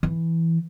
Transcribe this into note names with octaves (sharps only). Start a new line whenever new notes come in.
E3